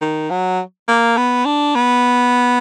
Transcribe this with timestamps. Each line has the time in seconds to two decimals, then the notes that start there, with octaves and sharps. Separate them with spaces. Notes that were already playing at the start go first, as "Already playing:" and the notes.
0.01 D#3
0.30 F#3
0.88 A#3
1.17 B3
1.45 D4
1.75 B3